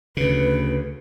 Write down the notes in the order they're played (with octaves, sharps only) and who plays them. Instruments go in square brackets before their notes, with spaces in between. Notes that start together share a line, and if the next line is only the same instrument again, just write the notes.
[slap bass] D2 C#3 [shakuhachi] B4